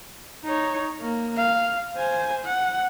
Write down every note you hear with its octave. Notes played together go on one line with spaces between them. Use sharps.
D#4 C#5
A#3
F5
C5 G#5
F#5